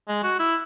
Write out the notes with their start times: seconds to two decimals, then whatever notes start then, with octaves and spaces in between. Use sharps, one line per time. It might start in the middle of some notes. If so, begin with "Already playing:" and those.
0.08 G#3
0.23 F#4
0.39 E4